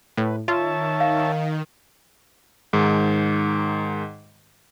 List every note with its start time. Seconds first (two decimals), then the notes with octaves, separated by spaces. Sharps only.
0.17 A2 B4
0.48 D#3 F4 C#5 E5 A5
1.01 F5
2.73 G#2 D#3